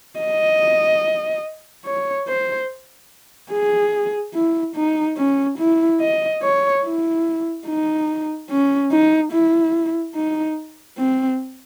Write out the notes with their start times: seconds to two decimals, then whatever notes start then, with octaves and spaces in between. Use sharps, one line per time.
0.20 D#5
1.85 C#5
2.27 C5
3.52 G#4
4.34 E4
4.75 D#4
5.18 C#4
5.59 E4
6.01 D#5
6.43 C#5
6.84 E4
7.67 D#4
8.50 C#4
8.91 D#4
9.32 E4
10.15 D#4
10.98 C4